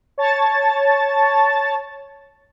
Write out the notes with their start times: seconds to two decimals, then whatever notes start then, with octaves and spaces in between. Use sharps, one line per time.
0.18 C#5 A5 A6